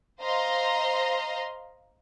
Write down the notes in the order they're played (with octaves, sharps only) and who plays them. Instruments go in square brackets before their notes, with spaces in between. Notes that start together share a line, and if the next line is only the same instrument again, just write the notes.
[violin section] C5 D#5 F5 A#5 C6